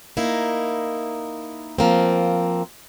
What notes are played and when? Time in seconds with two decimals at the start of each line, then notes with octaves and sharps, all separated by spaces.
0.17 A#3 D#4 E4
1.79 F3 A#3 C4